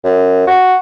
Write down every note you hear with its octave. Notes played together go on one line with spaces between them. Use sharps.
F#2
F#4